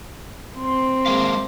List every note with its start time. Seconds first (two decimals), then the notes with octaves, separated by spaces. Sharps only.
0.56 C4 C6
1.06 G#3 A#3 F5